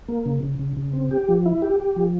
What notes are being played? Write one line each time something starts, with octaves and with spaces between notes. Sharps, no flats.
A#3
C#3
C#3
C#3
C#3
C4
G4
F3
E4
G4
G4
F3